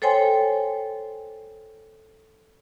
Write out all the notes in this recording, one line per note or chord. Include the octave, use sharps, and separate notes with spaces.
A4 C5 C#5 G5 G#5 C6